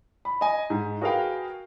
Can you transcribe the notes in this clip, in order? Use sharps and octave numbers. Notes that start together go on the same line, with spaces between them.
B5
D#5 G#5
G#2
F#4 G#4 A#4 B4 F5 G5